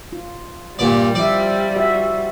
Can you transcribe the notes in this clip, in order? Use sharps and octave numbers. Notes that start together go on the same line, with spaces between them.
F4
G2 A#2 G3 D5
F3 F4 D5 E5
F#4 E5